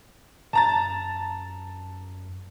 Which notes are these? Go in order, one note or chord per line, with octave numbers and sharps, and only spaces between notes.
F#2 A5 A#5 A6